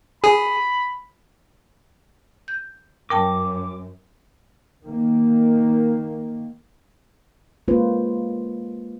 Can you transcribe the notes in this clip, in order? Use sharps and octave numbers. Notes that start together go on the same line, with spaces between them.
G#4 B5
G6
F#2 A#4 G5 A5 D6
D#3 A#3
G#3 A#3 C#4 F4 B4 C5